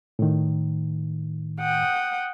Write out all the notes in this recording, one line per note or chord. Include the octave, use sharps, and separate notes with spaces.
A2 D#3
F#5 G5 D#6